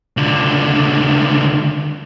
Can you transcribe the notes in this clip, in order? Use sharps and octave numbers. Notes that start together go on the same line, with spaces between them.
C#2 D3